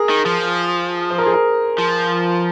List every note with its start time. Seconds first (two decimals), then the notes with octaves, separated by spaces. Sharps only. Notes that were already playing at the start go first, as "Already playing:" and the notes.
Already playing: G#4 A#4
0.09 D#3
0.26 F3
1.10 C5
1.18 A#4
1.26 G#4
1.33 A#4
1.79 F3